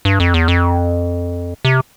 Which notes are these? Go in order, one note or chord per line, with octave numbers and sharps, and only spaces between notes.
G2
F2
E2
F2
C3